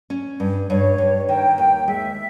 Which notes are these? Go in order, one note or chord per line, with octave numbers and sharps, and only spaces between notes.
C#4
G2
G2 C#5
G2
D#3 G5
D#2 G5
G#3 E5